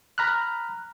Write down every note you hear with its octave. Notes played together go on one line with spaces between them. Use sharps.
A#5 B5 F6 F#6